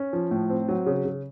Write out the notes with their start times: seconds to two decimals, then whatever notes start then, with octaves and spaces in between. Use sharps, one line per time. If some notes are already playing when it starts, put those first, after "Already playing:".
Already playing: C#4
0.13 F3
0.31 A2
0.50 C4
0.69 F#3
0.86 C#3
1.05 C#3